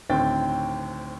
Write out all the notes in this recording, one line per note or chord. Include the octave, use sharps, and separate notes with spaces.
D2 A2 D#3 C4 G5 A6